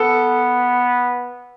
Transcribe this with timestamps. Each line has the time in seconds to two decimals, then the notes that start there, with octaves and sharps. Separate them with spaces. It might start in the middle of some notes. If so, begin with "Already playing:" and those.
Already playing: B3 A4